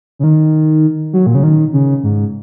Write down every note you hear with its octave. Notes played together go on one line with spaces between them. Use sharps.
C#3
D#3
F#3
A#2
C#3
D#3
C#3
G#2